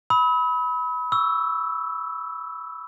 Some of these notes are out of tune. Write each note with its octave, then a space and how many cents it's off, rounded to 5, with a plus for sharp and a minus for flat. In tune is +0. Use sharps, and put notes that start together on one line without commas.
B5 +0 E6 -45
C#6 +15 E6 +0